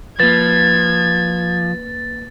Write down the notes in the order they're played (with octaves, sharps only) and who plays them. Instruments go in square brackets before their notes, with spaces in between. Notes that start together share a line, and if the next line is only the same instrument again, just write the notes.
[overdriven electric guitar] F3 [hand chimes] A#3 B4 [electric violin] G#6 [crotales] A6